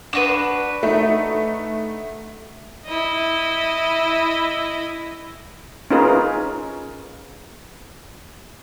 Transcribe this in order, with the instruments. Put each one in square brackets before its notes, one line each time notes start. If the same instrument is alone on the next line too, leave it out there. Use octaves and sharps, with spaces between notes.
[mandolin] D4 F#4 B4 [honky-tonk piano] E7
[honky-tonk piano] A3 D#4
[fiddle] E4 D#5
[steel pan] C#4 D#4 F4 G#4 A#4 B4